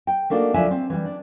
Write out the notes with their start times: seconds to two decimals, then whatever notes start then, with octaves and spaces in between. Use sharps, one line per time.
0.07 G5
0.30 A3 A#3 D4 D#4 F#4
0.54 D2 F3 D4 E4 E5 G#5
0.71 C4
0.90 E3 G3
1.05 D4